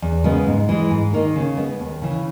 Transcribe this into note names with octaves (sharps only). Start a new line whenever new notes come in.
E2
C#3 G#3 B3
G#2
E3 G#3
G#2
D#3 A#3 D#4
C#3
G#3 B3
D#2
C#3 E3